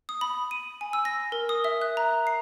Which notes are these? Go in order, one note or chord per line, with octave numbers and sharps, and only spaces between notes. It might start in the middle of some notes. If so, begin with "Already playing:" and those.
D#6
B5
D#7
G#5
E6
A#6
A#4
D#6
E5
F#6
A#5
C7